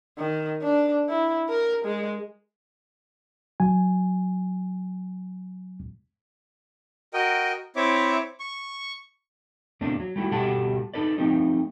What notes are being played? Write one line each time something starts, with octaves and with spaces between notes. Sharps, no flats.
D#3
D4
E4
A#4
G#3
F#3 G#5
F#4 A#4 D#5 G5
C4 E4 C#5 E5 D6
C#6
E2 B2 A3 A#3 C4 D4
F#3
G3 A3 E4 F#4
B2 G3 G4 A4 F#5 A5
D#4 A4 B4 D5
F3 A3 A#3 C4 D#4